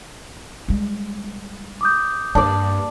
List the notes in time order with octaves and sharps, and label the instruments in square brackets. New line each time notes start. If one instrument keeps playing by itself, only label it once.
[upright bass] G3 G#3
[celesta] D6 D#6 G6
[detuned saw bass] G2 [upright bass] A#3 [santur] D4 D5